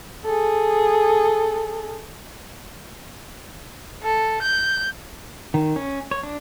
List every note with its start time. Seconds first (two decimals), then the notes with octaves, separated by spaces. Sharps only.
0.24 G#4 A4
4.03 A4
4.42 G6
5.54 D#3
5.76 C#4
6.11 C#5
6.23 D4